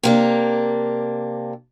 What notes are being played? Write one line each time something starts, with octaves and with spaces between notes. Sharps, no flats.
C3 A#3 D4